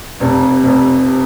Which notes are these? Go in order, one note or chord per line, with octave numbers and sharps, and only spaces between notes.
F1 F2 C3
F1 F2 C3